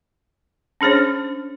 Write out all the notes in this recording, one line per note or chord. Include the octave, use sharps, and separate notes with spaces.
C#4 D4 G#4 C5 C#5